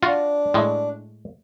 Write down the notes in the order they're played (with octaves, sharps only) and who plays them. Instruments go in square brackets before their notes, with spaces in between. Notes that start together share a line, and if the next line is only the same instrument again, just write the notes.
[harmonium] D4 [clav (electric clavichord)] F4 F#4
[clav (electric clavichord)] A2 G#3